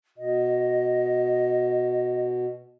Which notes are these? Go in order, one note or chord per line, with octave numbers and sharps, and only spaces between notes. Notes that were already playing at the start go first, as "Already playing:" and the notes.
B2 D#5